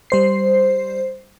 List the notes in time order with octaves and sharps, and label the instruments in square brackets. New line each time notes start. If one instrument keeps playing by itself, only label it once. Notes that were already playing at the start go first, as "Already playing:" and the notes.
[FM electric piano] G3 C5 C7